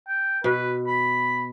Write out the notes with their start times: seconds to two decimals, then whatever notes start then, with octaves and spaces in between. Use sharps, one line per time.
0.08 G5
0.44 B2 B4
0.87 B5